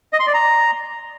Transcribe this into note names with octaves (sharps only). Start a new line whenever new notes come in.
D#5
C6
D5
A#5